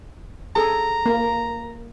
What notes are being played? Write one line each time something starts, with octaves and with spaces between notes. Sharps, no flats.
G#4 A4 A#5
A#3